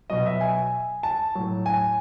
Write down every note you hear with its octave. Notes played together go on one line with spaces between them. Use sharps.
B2 F#3 D#5
E5
G#5
A5
A2 F#3
G#5